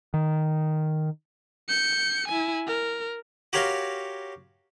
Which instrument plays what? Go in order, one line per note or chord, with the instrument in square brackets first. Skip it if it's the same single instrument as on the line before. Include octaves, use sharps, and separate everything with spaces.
[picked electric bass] D#3
[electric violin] G6 C#7
E4 G#5
A#4
[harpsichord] F#4 G4 A#4 C#5 F5 C6